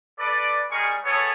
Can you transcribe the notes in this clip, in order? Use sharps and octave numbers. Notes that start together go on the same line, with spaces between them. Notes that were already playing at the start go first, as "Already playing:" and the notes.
A4 B4 D5
G3 G#3 G#4 A#4 C#6
B3 G#4 A4 C#5